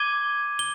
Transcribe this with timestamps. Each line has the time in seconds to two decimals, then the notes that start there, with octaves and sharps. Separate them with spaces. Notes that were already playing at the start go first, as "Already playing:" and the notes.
Already playing: D6 G#6 D#7 G7
0.59 G7